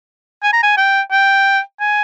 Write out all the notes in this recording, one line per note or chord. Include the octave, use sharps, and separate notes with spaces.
G#5
A#5
G#5
G5
G5
G#5